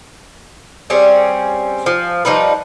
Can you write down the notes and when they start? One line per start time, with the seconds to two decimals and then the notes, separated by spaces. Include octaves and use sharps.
0.90 G3 C4 C#4 G#4
1.86 F3
2.25 F3 G3 D#4 B4